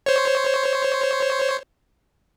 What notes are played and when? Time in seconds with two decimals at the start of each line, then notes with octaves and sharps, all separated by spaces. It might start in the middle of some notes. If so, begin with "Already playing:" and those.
0.06 C5 C#5